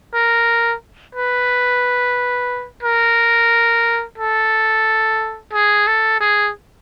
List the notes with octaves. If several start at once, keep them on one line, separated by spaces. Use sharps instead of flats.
A#4
B4
A#4
A4
G#4
A4
G#4